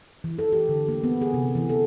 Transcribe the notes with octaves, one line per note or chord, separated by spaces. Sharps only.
E3
A4
G4
D3
A#3
B3
G#4
C3
E3
A4